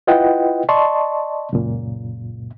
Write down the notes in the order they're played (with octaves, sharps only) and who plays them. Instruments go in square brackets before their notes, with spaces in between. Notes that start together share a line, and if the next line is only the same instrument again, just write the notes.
[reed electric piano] E4 F4 B4 D#5 F#5 G5
D5 D#5 A5 C6 C#6
C#2 F#2 A#2